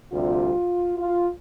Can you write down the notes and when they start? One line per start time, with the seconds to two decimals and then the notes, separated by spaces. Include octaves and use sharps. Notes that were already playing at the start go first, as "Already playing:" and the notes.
0.12 D2 C3 G3 F4
0.98 F4